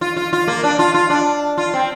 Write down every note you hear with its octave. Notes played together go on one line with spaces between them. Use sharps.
F4
F4
F4
A#3
D4
F4
F4
D4
F4
C4